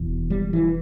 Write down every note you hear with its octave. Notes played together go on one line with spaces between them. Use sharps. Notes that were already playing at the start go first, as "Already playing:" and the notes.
Already playing: E1 E2 B2
G3
E3